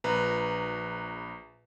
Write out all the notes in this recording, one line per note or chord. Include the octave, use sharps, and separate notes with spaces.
A#1 B4 A#5